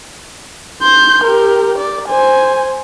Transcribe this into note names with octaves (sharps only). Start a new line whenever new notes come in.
C6 G6
G4 A#4
D5
C5 G#5